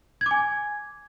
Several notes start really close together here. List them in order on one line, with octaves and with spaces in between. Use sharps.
G#6 D6 G#5